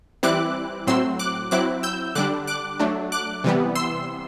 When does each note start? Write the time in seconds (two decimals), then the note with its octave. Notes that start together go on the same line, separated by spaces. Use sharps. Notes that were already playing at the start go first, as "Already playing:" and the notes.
0.23 E3 G3 C4 E4 D6 F#6
0.87 A2 F#3 C4 C6 E6
1.19 D6 F#6
1.51 F#3 C4 E4 D6 F#6
1.83 E6 G6
2.15 D3 G3 D4 D6 F#6
2.47 D6 F#6
2.79 F#3 A3 D4
3.12 D6 F#6
3.44 C3 E3 G3 B3
3.75 C6 E6